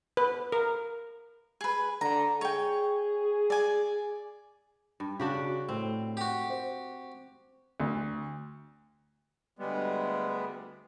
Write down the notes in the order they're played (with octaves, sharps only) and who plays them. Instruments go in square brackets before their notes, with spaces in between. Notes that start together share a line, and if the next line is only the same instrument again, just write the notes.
[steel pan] B4
A#4
[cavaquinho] G#4 B4
[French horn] D3 [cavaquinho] A#5
[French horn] G#4 [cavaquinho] C#5 G5
[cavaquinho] D5 G#5
[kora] G2
[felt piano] C#3 [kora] D4 F#4 G4
[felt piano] A2 [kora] C4
[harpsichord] F#4 G4
[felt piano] C5
[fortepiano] D2
[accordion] D2 G3 G#3 B3